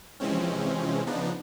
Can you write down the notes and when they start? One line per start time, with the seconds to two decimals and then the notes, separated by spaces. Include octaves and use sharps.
0.20 C3 E3 F3 G#3 C4 C#4
1.07 C#3 F3 B3 D4 D#4